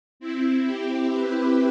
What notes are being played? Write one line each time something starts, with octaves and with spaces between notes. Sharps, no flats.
C4 E4
E4 G4
G4 B4